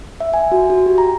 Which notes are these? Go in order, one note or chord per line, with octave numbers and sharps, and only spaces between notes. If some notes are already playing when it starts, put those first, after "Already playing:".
E5
G#5
F#4
F#4
G4
A#5